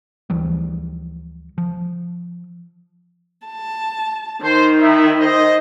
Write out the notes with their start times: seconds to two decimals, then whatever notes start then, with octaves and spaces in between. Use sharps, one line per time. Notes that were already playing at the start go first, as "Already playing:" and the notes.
0.30 D2 E3 F3 G3
1.58 F3
3.47 A5
4.42 D#3 C5
4.79 D#4 E4 E5
5.20 C5 D#5